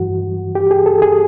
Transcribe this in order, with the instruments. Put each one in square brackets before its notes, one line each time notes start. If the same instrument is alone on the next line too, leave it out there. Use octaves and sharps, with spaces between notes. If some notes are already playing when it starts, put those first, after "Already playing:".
Already playing: [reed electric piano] G2 E3 F#4
G4
G#4
A4
G#4